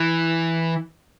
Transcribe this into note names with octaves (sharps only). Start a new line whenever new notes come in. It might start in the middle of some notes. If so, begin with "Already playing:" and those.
Already playing: E3